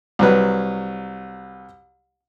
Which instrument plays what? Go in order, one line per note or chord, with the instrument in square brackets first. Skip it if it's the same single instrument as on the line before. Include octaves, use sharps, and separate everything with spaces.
[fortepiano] C2 F#3 B4